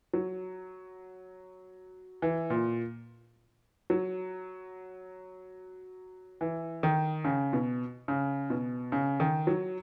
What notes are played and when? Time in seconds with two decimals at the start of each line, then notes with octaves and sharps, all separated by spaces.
0.14 F#3
2.22 E3
2.50 A#2
3.90 F#3
6.41 E3
6.83 D#3
7.24 C#3
7.53 B2
8.08 C#3
8.50 B2
8.92 C#3
9.20 D#3
9.47 F#3